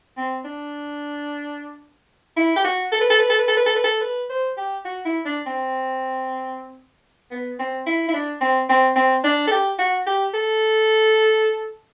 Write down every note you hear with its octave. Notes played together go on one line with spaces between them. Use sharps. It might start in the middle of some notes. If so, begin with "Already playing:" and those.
C4
D4
E4
G4
F#4
A4
B4
A4
B4
A4
B4
A4
B4
A4
B4
A4
B4
C5
G4
F#4
E4
D4
C4
B3
C4
E4
E4
D4
C4
C4
C4
D4
A4
G4
F#4
G4
A4